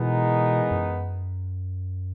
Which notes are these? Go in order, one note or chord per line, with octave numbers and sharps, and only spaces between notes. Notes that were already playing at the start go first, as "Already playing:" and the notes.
Already playing: B2 E3 G#3 B3 D#4 A#4
F#2